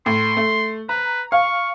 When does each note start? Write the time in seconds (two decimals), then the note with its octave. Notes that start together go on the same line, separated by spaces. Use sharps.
0.06 A2 C6
0.37 A3
0.89 B4 A#5
1.32 F5 C#6